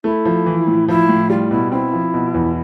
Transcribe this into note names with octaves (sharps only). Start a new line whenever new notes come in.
A3 E4
F3
E3
A2
F3 E4
A2
G3 F4
B2 E4
C4 E4
F3
B2
E2